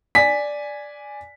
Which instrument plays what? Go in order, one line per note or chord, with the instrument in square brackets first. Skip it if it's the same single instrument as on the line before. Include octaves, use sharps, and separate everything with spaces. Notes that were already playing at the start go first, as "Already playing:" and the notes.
[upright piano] D5 G#5 B6